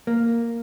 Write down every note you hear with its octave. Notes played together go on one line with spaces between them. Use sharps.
A#3